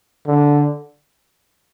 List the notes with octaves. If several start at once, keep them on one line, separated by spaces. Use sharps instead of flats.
D3